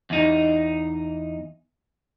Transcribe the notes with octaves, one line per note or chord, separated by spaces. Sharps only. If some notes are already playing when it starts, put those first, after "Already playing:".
E2 D#4